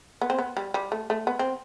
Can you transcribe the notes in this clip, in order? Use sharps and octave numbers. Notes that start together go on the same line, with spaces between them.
B3
C4
B3
G3
G3
A3
A3
B3
C4